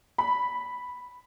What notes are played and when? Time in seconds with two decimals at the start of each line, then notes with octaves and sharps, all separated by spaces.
0.18 B5